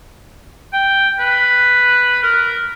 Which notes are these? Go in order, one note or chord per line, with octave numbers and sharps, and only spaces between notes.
G5
B4
A#4